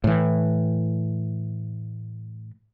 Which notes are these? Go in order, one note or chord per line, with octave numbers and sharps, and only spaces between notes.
A2 E3